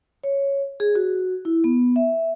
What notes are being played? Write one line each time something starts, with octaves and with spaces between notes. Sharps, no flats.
C#5
G#4
F#4
E4
B3
E5